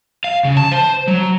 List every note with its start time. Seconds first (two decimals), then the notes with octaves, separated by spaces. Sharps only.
0.24 F5
0.45 C#3
0.57 A5
0.72 C5
1.08 F#3